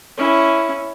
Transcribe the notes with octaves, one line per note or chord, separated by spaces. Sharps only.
C#4 E4